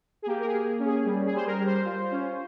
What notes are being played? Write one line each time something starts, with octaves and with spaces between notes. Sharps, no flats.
G#4
A#3 G4
A#4
G#4
A#3
C#4
G#4
G3
G#4
G3 C5
A#4
G3
C5
F4
C#4